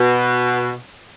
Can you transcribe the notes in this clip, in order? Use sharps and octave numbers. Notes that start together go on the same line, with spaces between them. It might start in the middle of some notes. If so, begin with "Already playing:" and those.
Already playing: B2